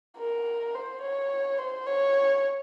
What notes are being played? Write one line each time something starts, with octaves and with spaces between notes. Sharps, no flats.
A#4
C5
C#5
C5
C#5